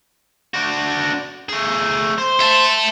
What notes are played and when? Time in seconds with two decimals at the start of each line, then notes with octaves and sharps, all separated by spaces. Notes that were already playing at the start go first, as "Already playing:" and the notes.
0.54 D4 F#4
1.49 A3 G#4
2.18 C5
2.41 E5 A5